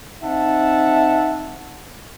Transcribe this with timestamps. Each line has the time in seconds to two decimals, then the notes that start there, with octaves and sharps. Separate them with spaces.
0.23 C4 D#4 E5 F#5 A5